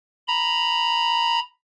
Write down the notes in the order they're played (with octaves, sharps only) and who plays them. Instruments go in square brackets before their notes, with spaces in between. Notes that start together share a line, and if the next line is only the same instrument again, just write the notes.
[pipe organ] A#5 B5